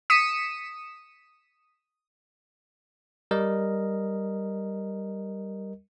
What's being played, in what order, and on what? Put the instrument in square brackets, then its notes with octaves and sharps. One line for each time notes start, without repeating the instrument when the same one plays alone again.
[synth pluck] D#6 B6 C#7 D#7 E7
[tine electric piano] G3 A#4 D#5